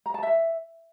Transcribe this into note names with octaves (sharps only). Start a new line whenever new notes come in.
A#5
A5
E5